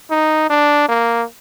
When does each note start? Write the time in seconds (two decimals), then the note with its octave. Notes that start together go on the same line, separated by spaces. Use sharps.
0.10 D#4
0.50 D4
0.88 A#3